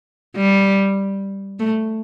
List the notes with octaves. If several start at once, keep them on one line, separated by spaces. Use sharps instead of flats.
G3
A3